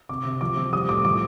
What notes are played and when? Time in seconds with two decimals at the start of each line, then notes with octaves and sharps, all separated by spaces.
0.09 C3 D6
0.25 C3
0.41 F3 D6
0.57 F3
0.73 G3 D#6
0.89 A2 D6
1.05 F3 D6